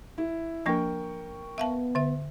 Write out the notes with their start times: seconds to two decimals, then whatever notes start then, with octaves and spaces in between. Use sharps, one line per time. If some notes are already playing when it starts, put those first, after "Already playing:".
0.18 E4
0.66 F3 A#3 D4 A#4 G5 C#6
1.58 B3 E5 F5 A5
1.95 D3 E5